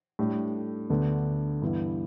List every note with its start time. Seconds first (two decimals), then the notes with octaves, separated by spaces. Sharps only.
0.19 A2 G3 D4
0.90 D2 D3 B3 D4
1.62 G2 E3 B3 E4